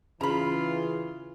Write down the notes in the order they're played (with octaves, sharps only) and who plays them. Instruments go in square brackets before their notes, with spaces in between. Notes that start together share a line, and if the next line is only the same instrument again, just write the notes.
[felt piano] C#3 [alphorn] E3 [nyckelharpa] F4 [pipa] A#5 B5